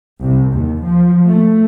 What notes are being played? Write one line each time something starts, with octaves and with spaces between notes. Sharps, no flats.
C2
D#2
F3
A3